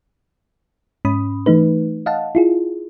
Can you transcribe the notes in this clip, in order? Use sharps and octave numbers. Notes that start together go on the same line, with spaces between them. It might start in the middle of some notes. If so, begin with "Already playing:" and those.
G#2 C#4 B5 D#6
E3 A3 D#4 B4
D#5 F5 F#5 A5
E4 F4 G#4